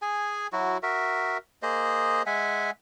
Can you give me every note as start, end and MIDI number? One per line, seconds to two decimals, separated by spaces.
0.02 0.47 68
0.02 0.47 80
0.53 0.78 54
0.53 0.78 64
0.53 0.78 66
0.83 1.38 66
0.83 1.38 70
0.83 1.38 76
1.62 2.22 58
1.62 2.22 68
1.62 2.22 72
1.62 2.22 75
2.26 2.71 56
2.26 2.71 76
2.26 2.71 78
2.26 2.71 80